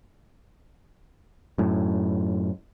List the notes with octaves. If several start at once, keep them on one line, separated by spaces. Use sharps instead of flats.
F#2 A2